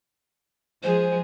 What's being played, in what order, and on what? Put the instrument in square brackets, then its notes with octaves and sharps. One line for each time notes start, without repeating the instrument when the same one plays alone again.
[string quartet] F3 G#3 G#4 [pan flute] C5